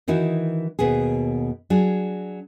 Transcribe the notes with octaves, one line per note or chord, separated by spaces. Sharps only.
D#3 E3 D#4 E4 F#4
D#2 B2 B3 G#4
F#3 D4 G#4